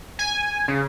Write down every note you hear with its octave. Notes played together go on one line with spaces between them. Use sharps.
G#5
C#3